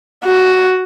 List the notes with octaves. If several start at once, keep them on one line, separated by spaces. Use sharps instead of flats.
F#4